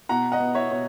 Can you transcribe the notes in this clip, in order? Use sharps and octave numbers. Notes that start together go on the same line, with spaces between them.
B2 F#5 A#5
D#5 F#5
B3
C#5 E5
B2 C#5